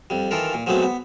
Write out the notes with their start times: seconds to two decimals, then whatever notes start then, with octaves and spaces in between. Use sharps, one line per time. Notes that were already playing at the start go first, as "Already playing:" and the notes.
0.10 F2 G3
0.31 D#3 E3 F4 A4 A#4
0.53 A#2
0.66 F3 F#3 G#3 A3 B3 C4
0.83 B3